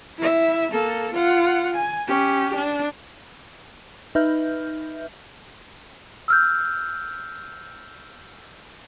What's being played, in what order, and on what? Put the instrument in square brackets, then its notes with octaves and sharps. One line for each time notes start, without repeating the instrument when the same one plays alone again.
[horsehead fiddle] E4 E5
A#3 A4
F4 F#5
G#5
C#4 G4
D4
[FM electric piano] D#4 B4 E5 F6 G6
[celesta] E6 F6 G6